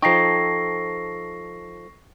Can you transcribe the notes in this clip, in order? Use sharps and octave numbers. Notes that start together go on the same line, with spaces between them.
F3 D#4 A4 G5 C#6 A#6 C7